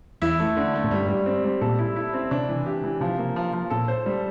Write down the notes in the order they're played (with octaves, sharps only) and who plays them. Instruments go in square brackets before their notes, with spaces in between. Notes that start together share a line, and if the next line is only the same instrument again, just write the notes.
[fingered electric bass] E2 [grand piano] E4
[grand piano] A3
D3
A3
[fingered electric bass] A2
[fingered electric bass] G2 [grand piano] G3
[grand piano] G3
C4
G3
[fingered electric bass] A#2 [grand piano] A4
[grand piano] E4
E4
C4
[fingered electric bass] C3 [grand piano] D4
[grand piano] E3
G4
E3
[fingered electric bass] C3 [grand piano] F3
[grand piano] A#3
F3
F3
[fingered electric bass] A#2 [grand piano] A4
[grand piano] C5
G3